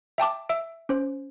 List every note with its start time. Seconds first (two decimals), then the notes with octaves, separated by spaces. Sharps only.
0.18 E5 G5 A5 D6
0.49 E5 E6 D7
0.89 C#4 C5